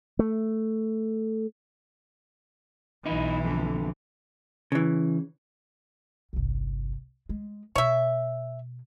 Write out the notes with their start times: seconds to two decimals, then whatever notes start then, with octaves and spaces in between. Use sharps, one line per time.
0.19 A3
3.06 B1 E3 D#4 E4
3.44 F2 D3
4.72 C#3 E3
6.33 G1 C2
7.29 G#3
7.76 B2 C#5 E5